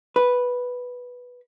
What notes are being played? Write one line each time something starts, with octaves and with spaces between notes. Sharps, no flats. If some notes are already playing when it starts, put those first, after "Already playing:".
B4